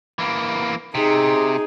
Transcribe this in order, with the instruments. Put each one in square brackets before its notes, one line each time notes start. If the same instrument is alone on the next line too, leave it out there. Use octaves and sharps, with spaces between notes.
[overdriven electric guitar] E3 A#3
[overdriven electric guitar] C3 [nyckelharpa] D#4 G#4